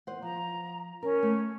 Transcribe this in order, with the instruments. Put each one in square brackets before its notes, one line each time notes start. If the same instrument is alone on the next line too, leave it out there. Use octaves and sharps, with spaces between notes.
[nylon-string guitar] E2 C5 F#5
[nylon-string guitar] F3 [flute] A#5
[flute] C#4 [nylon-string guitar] A#4
[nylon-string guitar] A3